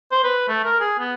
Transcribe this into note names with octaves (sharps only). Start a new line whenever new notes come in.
C5
B4
A3
A#4
G#4
B3